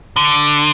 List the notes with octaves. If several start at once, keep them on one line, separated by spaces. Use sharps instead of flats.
D3